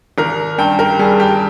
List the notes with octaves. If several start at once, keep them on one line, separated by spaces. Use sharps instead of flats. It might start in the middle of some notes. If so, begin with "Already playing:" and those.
G#1 A#4
G2 G5
A#4
G3 G#4
G4